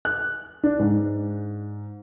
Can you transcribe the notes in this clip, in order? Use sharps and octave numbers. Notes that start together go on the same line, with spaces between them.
F#6
D4
G#2